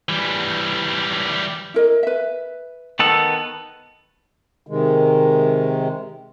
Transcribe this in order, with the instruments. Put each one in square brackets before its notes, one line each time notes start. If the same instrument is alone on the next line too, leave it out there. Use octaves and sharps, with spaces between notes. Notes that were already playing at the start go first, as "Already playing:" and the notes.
[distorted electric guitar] E3 G3
[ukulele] E4 A#4 D#5
B4 E5
[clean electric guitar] D#3 B3 A4 [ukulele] A5
[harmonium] C3 D#3 G#3